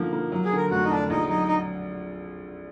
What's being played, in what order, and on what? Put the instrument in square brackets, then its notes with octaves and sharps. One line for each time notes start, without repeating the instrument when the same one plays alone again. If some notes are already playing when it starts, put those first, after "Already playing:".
Already playing: [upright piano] D3 F3 A#3 D#4
A#3
F#3
[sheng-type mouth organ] G#4
[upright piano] D3
[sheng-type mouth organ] A#4
[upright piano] F1 [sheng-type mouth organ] F#4
[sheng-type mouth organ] D#4
[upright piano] D3 [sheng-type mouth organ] D4
[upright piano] A#1 [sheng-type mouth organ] D#4
[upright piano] F#3 [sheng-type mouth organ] D#4
[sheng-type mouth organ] D#4